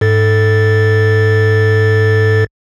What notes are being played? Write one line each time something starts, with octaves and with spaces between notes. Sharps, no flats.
G#2 A4 A6